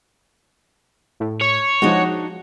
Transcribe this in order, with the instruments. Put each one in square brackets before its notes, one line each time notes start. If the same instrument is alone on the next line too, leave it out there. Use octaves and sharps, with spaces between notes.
[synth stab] A2
[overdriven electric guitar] C#5
[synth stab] F3 G#3 [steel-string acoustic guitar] D4 D#4 F#4